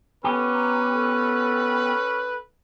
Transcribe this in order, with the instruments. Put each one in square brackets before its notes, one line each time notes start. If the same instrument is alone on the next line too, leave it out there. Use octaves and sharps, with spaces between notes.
[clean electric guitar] B3 G4 [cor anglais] C#4 [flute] A4 [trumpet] B4
[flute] A#5
A4